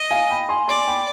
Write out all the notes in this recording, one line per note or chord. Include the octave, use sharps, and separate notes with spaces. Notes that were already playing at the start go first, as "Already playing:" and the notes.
Already playing: D#5
F5 G#5
G5 B5
G#5 C6
D5 G#5 C6
G5 B5